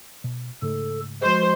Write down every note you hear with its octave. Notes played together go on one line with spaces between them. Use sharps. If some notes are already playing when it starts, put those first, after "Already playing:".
B2
G#2 C#3 A3 A4
F3 G#3 F#4 C5